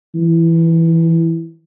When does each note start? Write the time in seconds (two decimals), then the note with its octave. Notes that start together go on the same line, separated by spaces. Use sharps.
0.15 E3